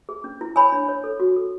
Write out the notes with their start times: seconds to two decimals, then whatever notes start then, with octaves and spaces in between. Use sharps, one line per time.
0.09 G#4
0.24 C#4
0.41 E4
0.56 C#5 G#5 B5
0.72 D4
0.89 C#5
1.04 A4
1.20 F#4
1.36 A4